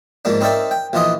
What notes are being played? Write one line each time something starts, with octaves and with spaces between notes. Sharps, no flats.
G#2 F3 A#3 D4
C4 D#4 A#4 D5 E5 G5
G5
A#1 E3 F3 F4 D#5 D#6